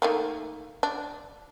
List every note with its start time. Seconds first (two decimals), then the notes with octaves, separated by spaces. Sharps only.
0.02 D#3 A3 A#3
0.83 D4